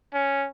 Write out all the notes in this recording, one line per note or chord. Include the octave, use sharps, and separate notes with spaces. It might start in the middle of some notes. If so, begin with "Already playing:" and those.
C#4